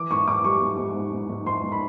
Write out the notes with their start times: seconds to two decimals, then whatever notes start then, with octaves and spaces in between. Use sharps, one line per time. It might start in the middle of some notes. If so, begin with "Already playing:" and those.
Already playing: E3 D6
0.11 G#2 C#6
0.28 G#2 D6
0.44 G3 C#6
0.62 G#2
0.78 G#2
0.96 G#2
1.13 G#2
1.29 G#2
1.46 G#2 C6
1.63 G#2
1.72 B5